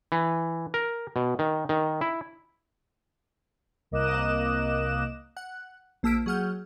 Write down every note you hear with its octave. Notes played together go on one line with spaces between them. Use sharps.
E3
A#4
B2
D#3
D#3
E4
C2 A#3 D#5 D6 F#6 E7
F#5 F#6
A#1 A#3 A5 E6 B6 D7
F#3 G#4 F#5 F6 G6